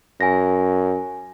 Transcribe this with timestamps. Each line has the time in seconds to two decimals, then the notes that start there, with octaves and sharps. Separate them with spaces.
0.21 F#2 G#5 A#6